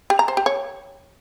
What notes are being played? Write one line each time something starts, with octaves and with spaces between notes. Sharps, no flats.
G4
A#5
C5
G4
C#5